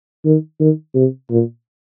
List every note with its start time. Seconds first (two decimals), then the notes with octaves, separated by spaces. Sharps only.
0.25 D#3
0.60 D#3
0.95 C3
1.31 A#2